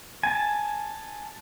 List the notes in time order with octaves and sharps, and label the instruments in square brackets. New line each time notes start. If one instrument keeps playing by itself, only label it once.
[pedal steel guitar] G#5 A5